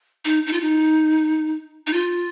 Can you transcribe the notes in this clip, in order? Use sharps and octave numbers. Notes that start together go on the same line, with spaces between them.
D#4
D#4
F4
D#4
D#4
F4